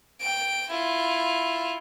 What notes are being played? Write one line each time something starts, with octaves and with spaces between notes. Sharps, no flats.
G5 D7
E4 F4